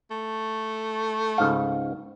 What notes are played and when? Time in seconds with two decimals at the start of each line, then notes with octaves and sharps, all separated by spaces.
0.11 A3
1.38 C#2 G#2 F5